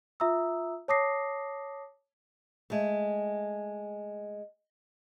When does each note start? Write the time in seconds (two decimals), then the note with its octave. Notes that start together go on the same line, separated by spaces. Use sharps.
0.20 F4 E5 A#5 D#6 E6
0.88 C#5 A5 D6 D#6 A#6 C7
2.70 G#3 A3